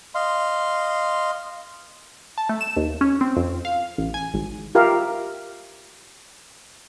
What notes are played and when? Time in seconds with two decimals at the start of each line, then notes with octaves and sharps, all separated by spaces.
0.15 D#5 F5 C6
2.38 A5
2.49 A3
2.61 E7
2.76 D#2
3.01 C#4
3.21 C4
3.37 F2
3.65 F5
3.98 A1
4.14 G#5
4.34 G#1
4.75 F4 G4 A#4 E5 F5